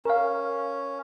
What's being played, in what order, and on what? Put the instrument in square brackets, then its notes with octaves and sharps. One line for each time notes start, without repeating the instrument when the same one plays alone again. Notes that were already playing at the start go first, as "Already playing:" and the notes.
[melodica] C#4 [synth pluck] A#4 F5